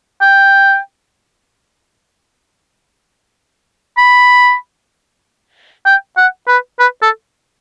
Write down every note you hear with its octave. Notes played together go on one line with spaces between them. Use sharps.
G5
B5
G5
F#5
B4
B4
A4